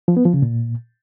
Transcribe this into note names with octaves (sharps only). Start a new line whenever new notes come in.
F3
B3
F3
C#3
A#2